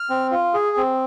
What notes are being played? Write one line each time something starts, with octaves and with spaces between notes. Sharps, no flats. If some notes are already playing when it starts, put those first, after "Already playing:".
Already playing: F6
C4
F4
G#4
C4